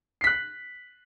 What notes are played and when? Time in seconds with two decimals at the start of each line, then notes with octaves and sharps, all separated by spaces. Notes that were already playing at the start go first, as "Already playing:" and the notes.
0.21 C7
0.24 B6
0.27 F#6